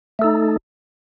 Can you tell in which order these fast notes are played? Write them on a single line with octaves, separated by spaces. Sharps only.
A3 A4 D#4